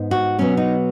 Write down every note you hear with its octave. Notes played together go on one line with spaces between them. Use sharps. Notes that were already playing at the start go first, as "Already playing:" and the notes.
Already playing: G#2 B3
F#4
B2 F#3 B3 C#4
D#4